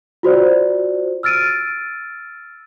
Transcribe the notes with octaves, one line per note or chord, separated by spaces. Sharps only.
F4 F#4 C5 D5
E6 F6 A6 D7 D#7